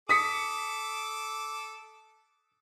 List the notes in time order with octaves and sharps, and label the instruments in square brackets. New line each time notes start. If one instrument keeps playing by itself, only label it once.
[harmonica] A4 D6 [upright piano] D#6 B6 C#7